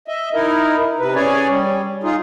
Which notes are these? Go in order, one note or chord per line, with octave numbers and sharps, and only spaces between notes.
D#5 E5
D#4 E4 A#4
C3 B4
C#4 G#4 C#5 D5 G#5
G3
D#4 F4 G#4